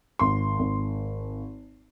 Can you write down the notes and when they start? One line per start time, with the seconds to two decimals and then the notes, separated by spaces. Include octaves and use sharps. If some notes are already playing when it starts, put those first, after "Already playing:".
0.19 G#1 C6
0.59 G#1